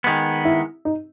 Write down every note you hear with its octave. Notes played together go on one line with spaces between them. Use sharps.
D#3 G#3 B3
E4
D#4